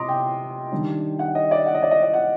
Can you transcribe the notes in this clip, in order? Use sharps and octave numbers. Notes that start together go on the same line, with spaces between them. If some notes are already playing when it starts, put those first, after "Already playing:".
Already playing: C3 D#5 A#5 C6 D6 D#6
G5
D#3 G3 D4
F#5
D#5
D5
F#5
D#5
D5
D#5
D#5
F#5